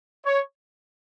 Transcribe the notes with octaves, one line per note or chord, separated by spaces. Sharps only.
C#5